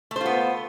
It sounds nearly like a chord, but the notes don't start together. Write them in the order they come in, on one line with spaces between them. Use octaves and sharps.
A3 C5 F4 B3